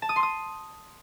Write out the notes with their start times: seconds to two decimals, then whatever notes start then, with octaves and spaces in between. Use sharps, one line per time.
0.02 A5
0.09 D#6
0.16 C6
0.23 D#6